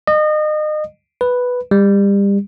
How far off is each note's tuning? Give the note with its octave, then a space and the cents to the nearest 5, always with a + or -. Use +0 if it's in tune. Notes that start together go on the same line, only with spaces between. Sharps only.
D#5 -30
B4 +0
G3 +30